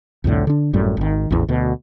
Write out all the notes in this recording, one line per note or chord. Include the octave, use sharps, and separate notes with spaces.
C2 F2 A2 D3
D3 D4
G#1 F#2 A2 G3
G#1 D#3
A1 E2
D2 B2